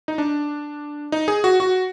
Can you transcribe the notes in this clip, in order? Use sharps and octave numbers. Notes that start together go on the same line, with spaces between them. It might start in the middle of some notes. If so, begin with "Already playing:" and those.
D#4
D4
D#4
G#4
F#4
F#4